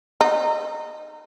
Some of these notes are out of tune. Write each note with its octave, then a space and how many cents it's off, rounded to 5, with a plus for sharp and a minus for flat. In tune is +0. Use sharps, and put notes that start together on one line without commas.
D#4 -20